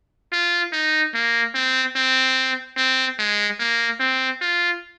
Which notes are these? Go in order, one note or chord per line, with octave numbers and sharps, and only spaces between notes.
F4
D#4
A#3
C4
C4
C4
G#3
A#3
C4
F4